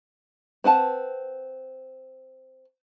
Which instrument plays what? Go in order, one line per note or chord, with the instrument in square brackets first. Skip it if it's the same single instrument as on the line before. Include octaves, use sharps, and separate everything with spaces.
[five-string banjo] C4 B4 F#5 A5